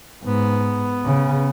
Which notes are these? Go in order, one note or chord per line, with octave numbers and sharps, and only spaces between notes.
G#2 B3
C#3